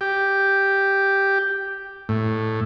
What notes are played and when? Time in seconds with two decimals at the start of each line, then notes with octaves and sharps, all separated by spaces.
0.01 G4
2.09 A2